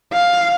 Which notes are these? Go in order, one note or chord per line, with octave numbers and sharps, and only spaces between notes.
F5